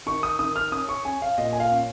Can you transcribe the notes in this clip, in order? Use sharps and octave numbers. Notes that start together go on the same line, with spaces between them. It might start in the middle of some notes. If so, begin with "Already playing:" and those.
D#3 C#6
D#6
D#3 D#6
F6
C#4 D#6
C#6
C#4 G#5
F5
A#2 D#5
G#5
F5
C#4